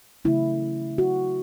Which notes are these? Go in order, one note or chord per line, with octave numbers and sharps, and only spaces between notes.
C#3 F#3 A3 E4
F#4